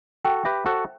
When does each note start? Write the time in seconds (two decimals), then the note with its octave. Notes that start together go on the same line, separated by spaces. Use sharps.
0.25 F#4 A4 G5
0.45 G4 B4 E5
0.66 F#4 A4 C5